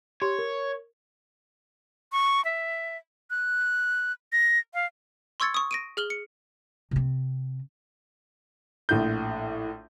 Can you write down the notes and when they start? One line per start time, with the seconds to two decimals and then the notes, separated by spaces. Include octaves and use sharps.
0.22 G4 C#5 C6
0.39 A#4
2.12 C#6
2.45 E5
3.31 F#6
4.33 A#6
4.74 F5
5.40 C6 C#6 E6 G#6 A6 C#7
5.54 C#6 D#6
5.71 A#6 D7 D#7
5.97 G#4 F6 F#7 G7
6.10 C#7
6.91 C3 C4
8.89 A#1 A2 G6